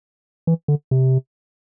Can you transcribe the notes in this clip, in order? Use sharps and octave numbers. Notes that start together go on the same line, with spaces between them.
E3
D3
C3